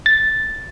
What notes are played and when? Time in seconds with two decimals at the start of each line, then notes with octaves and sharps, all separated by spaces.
0.06 A6